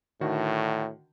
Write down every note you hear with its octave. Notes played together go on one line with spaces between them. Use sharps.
A2 D3 D#3 F#4